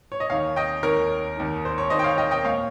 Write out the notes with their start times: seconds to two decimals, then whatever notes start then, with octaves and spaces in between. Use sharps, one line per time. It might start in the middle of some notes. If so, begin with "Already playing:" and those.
0.12 C#5
0.20 D#5
0.30 D#2 D#3 C#5 F5
0.56 D#5 G5
0.83 D#2 D#3 A#4 C#5
1.37 D#2 D#3
1.65 C5
1.78 C#5
1.90 D#2 D#3 C5 D#5
1.99 G5
2.04 C#5 F5
2.18 D#5 G5
2.31 D#5 G5
2.45 A#2 C#5 F5